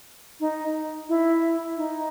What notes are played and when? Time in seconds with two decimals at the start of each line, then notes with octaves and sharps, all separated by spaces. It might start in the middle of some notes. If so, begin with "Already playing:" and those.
0.40 D#4
1.09 E4
1.77 D#4